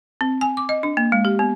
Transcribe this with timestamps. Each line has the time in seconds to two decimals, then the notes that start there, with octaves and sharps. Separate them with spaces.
0.21 C4
0.41 G#5
0.57 D6
0.69 D#5
0.83 D4
0.97 A#3
1.12 G#3
1.25 G4
1.39 B3